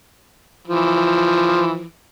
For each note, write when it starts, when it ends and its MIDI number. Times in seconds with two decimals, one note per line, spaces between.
0.68 1.84 52
0.68 1.84 53